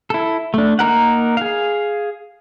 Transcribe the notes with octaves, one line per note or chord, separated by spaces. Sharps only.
E4 A4
A3 D4
A#3 D#4 A#4 F#5
G#4 F5